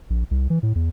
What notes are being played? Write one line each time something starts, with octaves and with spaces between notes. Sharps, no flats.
A#1
C2
E3
A2
E2